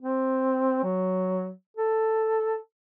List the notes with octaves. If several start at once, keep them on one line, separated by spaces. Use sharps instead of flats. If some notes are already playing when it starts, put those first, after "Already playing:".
C4
F#3
A4